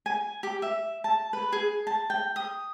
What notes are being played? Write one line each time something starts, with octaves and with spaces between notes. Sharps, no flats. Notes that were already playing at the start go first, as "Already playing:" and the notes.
G#5
G4
E5
A5
B4
G#4
A5
G5
D#6